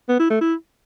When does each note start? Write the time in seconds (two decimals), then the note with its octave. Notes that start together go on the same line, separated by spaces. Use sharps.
0.09 B3
0.20 E4
0.30 A3
0.41 E4